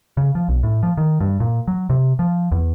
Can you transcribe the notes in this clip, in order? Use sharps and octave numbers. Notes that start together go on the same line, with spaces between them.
C#3
F3
B1
A2
F3
D#3
G2
A#2
F#3
C3
F3
E2